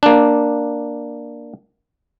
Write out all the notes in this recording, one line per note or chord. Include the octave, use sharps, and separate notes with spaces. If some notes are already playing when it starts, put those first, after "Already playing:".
A#3 D4